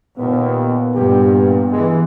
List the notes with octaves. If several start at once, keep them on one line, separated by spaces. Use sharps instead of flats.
D#2 A#2 B3
G2 A#2 G4
E3 G#3